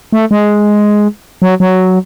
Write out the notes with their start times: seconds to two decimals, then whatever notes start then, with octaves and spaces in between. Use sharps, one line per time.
0.13 A3
0.31 G#3
1.42 F#3
1.60 F#3